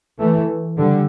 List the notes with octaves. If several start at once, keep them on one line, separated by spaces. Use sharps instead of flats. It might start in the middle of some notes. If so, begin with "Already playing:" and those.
E3 A3
D3 G3